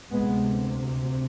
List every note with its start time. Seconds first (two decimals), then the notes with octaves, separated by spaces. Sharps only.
0.10 D2 C3 G#3 B3